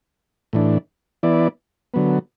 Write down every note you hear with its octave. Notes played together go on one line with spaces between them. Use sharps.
A2 E3 D4
E3 B3 E4 D5
D3 F#3 B3